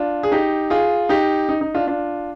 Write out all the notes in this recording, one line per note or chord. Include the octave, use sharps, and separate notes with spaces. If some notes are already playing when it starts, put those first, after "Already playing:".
Already playing: D4 F4
G#4
D#4 G4
F4 G#4
D#4 G4
D#4
D#4
D4 F4
D4 F4